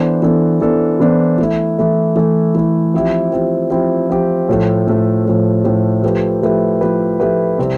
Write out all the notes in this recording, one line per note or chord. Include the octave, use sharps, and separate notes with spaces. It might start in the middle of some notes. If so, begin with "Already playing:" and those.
Already playing: E3 B3 D4 A4 C5
E3 B3 D4 A4 C5
E3 B3 D4 A4 C5
E3 B3 D4 A4 C5
E3 A3 E4
E3 A3 E4
E3 A3 E4
E3 A3 E4
F3 C4 E4 G4
F3 C4 E4 G4
F3 C4 E4 G4
F3 C4 E4 G4
A2 F3 A3
A2 F3 A3
A2 F3 A3
A2 F3 A3
F3 A3 E4 G4 B4
F3 A3 E4 G4 B4
F3 A3 E4 G4 B4
F3 A3 E4 G4 B4
C3 G3 C4 E4